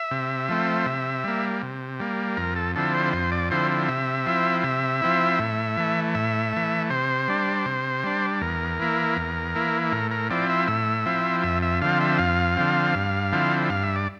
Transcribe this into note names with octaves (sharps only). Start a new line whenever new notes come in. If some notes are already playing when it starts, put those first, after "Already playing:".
Already playing: E5
C3
F3 A3 C4
C3
G3 A#3
C3
G3 A#3
F2 A#4
A4
D3 F3 C4 E4 A4
C5
F2 C5
D5
D3 F3 C4 E4 C5
C3 E5
F3 C4 E4
C3 E5
F3 C4 E4
A2
E3 A3
A2 E5
E3 A3
C3 C5
G3 D4
C3
G3 D4
E2 A#4
E3 A#3 E4
E2
E3 A#3 E4
A2 A#4
A#4
F3 C4 E4 D5
E5
A2 E5
F3 C4 E4
F2 E5
E5
D3 F3 C4 F5
E5
F2 F5
D3 F3 C4
G2
D3 F3 C4 E4
G2 F5
E5
D5